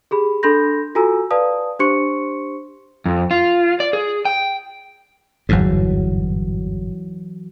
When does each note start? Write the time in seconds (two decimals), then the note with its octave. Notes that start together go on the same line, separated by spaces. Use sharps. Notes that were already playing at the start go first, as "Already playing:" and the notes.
0.11 G4 G#4 B5
0.43 D4 A4 B5 C6 G6 A#6
0.95 F4 F#4 A4 G#5 A#5 E6
1.31 B4 D5 F5 A5 D#6
1.79 D4 G4 C5 C6 C#6 C#7
3.06 F2
3.31 F4
3.80 D5
3.93 G#4
4.25 G5
5.49 G1 E2 G#2 E3 F#3